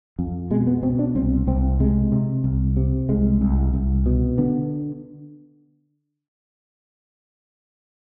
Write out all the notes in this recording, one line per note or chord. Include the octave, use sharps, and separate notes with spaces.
F2
B2 G#3
B3
B2 C4
D4
C2 C4
C2 C4
C3 G#3
C3
C2
C3
C2 G#3
C2
C2
B2
D3 B3